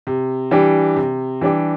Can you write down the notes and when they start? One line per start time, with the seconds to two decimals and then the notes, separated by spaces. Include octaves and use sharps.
0.07 C3
0.51 E3 G3 D4 G4
0.96 C3
1.41 E3 G3 D4 G4